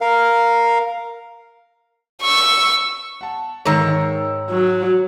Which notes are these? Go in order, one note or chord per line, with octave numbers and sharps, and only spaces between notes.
A#4 F5
C#6 E6
F#5 A5
G#2 D#3 A#4 C#5 A#5 E6
F#3